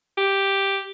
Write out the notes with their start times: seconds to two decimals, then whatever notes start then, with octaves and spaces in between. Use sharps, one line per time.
0.18 G4